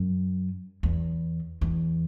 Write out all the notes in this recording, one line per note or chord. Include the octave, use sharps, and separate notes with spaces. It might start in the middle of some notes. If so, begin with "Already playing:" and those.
Already playing: F#2
E2
E2